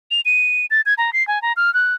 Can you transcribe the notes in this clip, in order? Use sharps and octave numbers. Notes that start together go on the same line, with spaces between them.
F7
D#7
A6
G#6
A#5
C7
G#5
A#5
F6
F#6